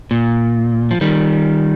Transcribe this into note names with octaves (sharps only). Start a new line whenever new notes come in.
A#2
F3
D#3 G3